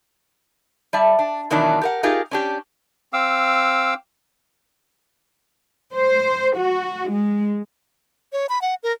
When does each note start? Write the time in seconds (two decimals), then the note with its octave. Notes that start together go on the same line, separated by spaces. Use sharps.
0.93 G3 D5 E5 A5
1.19 D4
1.50 E2 B2 D#3 E3 F#3 D4
1.81 G4 A#4 F#5
2.03 D#4 F4 G4 G#4 A#4
2.31 C#4 D4 G4
3.13 C4 F5 D6 E6
5.94 C5
6.57 F#4
7.11 G#3
8.33 C#5
8.49 B5
8.62 F#5
8.83 A#4